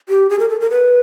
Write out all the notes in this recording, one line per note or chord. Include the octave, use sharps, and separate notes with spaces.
G4
G#4
A#4
A4
A#4
B4